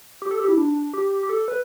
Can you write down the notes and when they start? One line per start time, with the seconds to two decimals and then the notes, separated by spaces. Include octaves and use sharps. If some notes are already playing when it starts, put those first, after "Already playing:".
0.22 G4
0.31 A4
0.40 G4
0.48 E4
0.58 D4
0.94 G4
1.23 G4
1.29 A4
1.48 B4